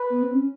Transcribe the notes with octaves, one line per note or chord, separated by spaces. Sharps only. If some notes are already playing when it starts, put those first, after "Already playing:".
Already playing: B4
B3
C4
C#4